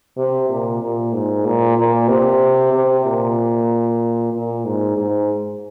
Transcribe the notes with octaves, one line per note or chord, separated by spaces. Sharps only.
C3
A#2
A#2
G#2
A#2
A#2
C3
C3
A#2
A#2
G#2
G#2